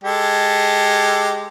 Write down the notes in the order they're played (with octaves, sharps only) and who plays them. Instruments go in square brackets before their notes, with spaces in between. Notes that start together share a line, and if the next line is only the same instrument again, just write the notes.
[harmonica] G#3 G4 A4